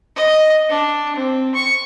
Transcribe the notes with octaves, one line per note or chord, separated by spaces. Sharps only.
D#5
D4
C4
C#6